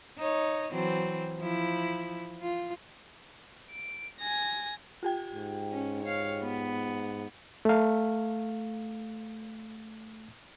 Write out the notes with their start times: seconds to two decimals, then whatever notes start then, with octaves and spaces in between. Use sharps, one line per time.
0.18 D#4 C#5
0.71 E3 F#3 C4
1.39 F3 E4
2.42 F4
3.71 D7
4.19 G#5 A#6
5.03 F4 G4 G5
5.34 G#2
5.72 C#4
6.03 C#5 F5
6.42 B3
7.65 A3 F5